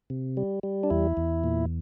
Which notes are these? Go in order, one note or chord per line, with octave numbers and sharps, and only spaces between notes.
C3
G3
G3
D4
E2 E4
E2
A#2